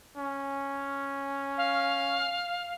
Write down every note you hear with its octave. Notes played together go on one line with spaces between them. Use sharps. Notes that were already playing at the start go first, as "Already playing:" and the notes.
C#4
F5